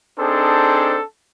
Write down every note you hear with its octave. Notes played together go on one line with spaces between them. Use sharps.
C4 D4 D#4 G#4 A4 C5